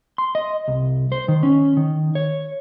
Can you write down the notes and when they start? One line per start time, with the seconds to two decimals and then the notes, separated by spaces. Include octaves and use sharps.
0.18 C6
0.35 D#5
0.68 C2
1.12 C5
1.28 D#3
1.43 C#4
1.77 D#3
2.15 C#5